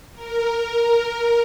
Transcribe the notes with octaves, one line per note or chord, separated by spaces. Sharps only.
A#4